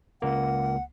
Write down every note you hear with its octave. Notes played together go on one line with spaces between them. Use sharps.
C#2 A#3 F#5